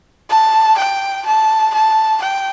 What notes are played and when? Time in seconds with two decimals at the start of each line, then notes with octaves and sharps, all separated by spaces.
0.30 A5
0.78 G5
1.26 A5
1.74 A5
2.22 G5